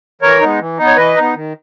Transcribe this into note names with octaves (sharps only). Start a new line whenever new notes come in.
E3 A#4 C#5
G#3 B3 D#4
E3
B3 D#4
C#5
E3 B4 D#5
B3 D#4
D#3